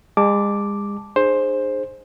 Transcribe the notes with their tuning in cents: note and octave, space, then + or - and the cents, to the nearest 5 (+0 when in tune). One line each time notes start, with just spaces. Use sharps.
G#3 -40 A5 +0 D6 +0
D#4 -45 G#4 +0 C5 +10